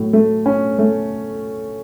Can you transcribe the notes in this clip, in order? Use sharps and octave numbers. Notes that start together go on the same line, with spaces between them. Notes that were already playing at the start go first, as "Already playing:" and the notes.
Already playing: A2 F#3
A3
C#4
A3